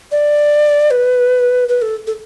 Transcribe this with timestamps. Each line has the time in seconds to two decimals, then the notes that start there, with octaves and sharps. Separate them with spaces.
0.12 D5
0.91 B4
1.68 B4
1.82 A4
2.07 A4